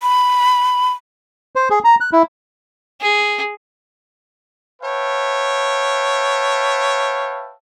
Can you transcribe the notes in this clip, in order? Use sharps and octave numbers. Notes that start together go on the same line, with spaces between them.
B5
C5
G#4
A#5
F#6
E4
G#4
B4 C#5 E5 F5 G5 A5